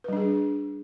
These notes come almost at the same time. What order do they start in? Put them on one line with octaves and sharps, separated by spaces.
B4 G3 D4 G#4